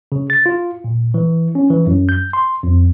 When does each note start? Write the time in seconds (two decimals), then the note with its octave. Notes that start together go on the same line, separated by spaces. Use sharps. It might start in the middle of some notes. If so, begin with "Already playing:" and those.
0.12 C#3
0.30 A6
0.46 F4
0.84 A#2
1.14 E3
1.55 C#4
1.70 E3
1.87 F#2
2.09 G6
2.33 C6
2.63 F2